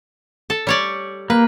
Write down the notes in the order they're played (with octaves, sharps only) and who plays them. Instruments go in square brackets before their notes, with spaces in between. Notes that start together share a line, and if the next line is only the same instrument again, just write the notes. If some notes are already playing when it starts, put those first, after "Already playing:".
[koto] A4
G3 C#5 D5
[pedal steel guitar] A#3 [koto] B4